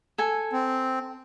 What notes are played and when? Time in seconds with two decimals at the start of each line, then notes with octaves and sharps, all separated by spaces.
0.18 A4 G#5
0.52 C4